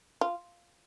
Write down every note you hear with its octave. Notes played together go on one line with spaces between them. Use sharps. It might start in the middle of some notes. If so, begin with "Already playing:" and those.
F4